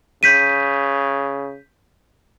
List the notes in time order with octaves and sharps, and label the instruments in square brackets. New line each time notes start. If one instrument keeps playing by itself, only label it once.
[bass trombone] C#3 [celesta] G6 B6 D#7